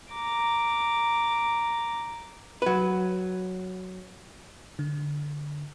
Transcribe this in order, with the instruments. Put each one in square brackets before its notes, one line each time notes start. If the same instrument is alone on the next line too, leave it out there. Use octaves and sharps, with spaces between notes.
[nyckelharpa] A#5 D6
[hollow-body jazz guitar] F#3 B4
[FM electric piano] D3